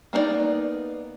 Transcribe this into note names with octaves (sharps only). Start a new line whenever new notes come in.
A#3 B3 D4 D#4 D5